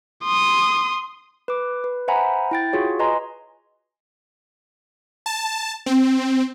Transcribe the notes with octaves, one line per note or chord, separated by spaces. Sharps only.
C6 D#6
B4 D6
B4
C5 E5 F#5 G#5 A#5 B5
E4 G5 A6
F4 F#4 G#4 C#5
B4 D#5 G#5 A#5 C6
A5
C4